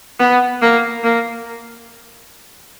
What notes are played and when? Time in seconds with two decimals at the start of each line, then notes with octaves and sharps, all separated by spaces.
0.19 B3
0.62 A#3
1.04 A#3